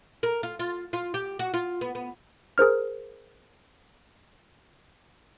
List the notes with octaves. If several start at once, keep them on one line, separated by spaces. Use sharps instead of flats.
A#4
F4
F4
F4
G4
F#4
F4
B3
B3
G#4 A#4 C5 F6